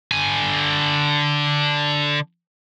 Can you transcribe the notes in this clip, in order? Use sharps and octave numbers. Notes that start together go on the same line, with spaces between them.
D3 G#5